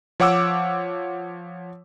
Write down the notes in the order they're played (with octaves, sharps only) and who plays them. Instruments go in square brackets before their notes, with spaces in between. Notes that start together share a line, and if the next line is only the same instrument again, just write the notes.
[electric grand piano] F3 C#5 F#5 D6 E6